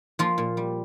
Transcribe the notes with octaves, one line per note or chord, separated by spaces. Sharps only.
F3 A#3 F4
A#2
G3